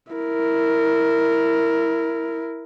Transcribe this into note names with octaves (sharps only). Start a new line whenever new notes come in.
E4 A#4